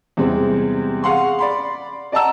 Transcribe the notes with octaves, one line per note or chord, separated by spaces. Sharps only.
E2 C3 G3 G#3 C4
G#4 F5 F#5 C6 C#6
D5 B5 C6
D5 D#5 F#5 A5 A#5 E6